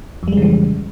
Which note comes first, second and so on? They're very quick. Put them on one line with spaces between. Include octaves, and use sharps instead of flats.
F2 G3 G#3 C#3 E3